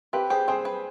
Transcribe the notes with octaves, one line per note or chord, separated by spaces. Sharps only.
C4 G4 B4
G4 G#4 C5
C4 G#4 C5
B4